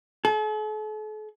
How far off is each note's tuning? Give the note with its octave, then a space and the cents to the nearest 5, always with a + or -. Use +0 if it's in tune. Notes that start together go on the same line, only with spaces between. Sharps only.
A4 -45